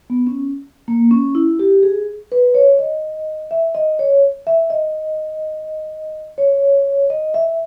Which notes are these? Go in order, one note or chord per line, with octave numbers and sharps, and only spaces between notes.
B3
C#4
A#3
C#4
E4
G4
G#4
B4
C#5
D#5
E5
D#5
C#5
E5
D#5
C#5
D#5
E5